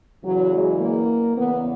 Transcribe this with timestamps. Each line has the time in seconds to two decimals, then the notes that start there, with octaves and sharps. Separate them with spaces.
0.23 E2 C#3 E3 F#3
0.52 G#3
0.80 A#3
1.36 E2 C#3 E3 B3